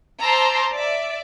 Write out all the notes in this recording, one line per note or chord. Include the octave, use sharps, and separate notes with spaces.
C5 A5 A#5 C6 D6 E6
D5 E5